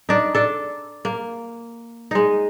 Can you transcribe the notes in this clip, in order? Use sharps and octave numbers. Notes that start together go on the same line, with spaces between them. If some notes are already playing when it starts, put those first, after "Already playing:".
D4 D#4
D4 A4
A#3
G#3 D#4